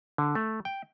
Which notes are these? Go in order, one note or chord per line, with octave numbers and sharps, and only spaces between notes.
D3
A3
G5